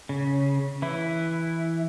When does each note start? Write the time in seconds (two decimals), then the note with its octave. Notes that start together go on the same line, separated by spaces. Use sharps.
0.09 C#3
0.82 E3 E4